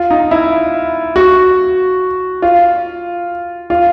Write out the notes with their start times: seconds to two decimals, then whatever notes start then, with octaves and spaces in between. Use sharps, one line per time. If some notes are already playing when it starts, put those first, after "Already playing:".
Already playing: F4
0.10 D#4
0.31 E4
1.16 F#4
2.42 F4
3.70 F4